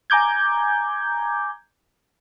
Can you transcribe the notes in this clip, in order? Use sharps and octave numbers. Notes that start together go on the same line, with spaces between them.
G#5 A#5 D6 G6 G#6